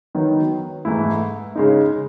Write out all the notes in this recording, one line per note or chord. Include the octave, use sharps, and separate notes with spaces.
D#3 F#3 B3 D#4
G#2 E3 A3 E4
C#3 G#3 D#4